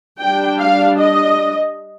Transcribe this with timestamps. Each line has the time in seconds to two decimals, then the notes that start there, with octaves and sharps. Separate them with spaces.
0.20 G3 D4 G5
0.60 F5
0.99 D#5